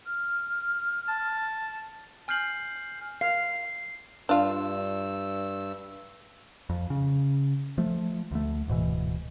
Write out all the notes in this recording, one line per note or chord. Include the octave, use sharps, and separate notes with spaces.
F6
A5
G#5 F6 G6 C7 F#7
F5 C7
G2 D4 F4 E6
F2
C#3
F3 A3
D2 A3
D1 G#2 B2 E3